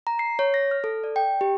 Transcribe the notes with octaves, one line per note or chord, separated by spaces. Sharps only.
A#5
C7
C#5
A#6
F6
A4
D5
G5
G4